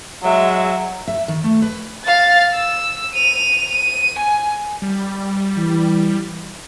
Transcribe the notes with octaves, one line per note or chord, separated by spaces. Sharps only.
F#3 G#3 E5
E5
D#3
A3
B4
F5 A6
E6
D#7 F7
D#7
G#5
G3
E3